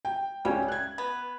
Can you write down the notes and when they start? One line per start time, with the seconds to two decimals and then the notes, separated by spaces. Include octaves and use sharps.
0.05 G5
0.45 C#2 G3 C#4
0.68 F#6 G#6
0.98 B3